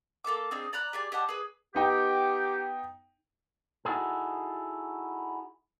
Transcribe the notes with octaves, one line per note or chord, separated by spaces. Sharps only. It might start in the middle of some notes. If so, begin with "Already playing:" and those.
A#3 A4 E5 D6
C4 D4 D#4 G#4
D5 A#5 B5 F#6
G4 G#4 D5
G4 D#5 F#5 A5
G#4 B4
B3 D#4 G4 G5
D#4 E4 F#4 G#4 A4